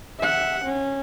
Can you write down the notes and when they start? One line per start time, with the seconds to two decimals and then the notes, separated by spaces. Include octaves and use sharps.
0.20 E5 F#5
0.64 C#4